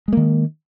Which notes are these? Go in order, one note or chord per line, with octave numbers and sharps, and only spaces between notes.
D#3 G#3 A#3